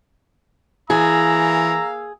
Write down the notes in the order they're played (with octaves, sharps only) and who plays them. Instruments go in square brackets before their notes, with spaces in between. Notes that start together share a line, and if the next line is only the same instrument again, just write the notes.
[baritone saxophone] E3 [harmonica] A#3 F5 E6 [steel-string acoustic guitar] G#4 [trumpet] A#5